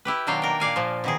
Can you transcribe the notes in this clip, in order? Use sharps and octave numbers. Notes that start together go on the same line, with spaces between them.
E4 G4 B4
B2 D#3 F#3 D4 F5 G5
A#3 A#4 G5
A#2 D5 F5 G#5
A#2 F3
B2 D#3 G#4